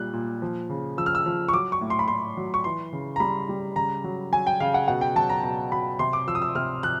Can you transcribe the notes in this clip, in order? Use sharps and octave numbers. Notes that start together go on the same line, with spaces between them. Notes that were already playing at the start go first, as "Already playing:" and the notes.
Already playing: A#2 G3 F#6
A#2
F3
C#3
F3 E6
F6
E6
F3
C#6
F#3 D6
C#6
A2
C6
B5
A2 C6
F#3
C#6
E3 C6
C#3
A#5
G3 B5
G3
C#3 A#5
F#3
F#3 G#5
G5
C#3 F5
F#5
B2 F#5
G5
F#3 A5
A#5
B2 A#5
F#3 B5
C3 C6
D6
F3 E6
D#6
E6
C3 F6
F3 F#6